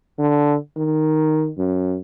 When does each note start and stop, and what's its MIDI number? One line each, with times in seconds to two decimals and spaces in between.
0.19 0.55 50
0.77 1.51 51
1.58 1.98 42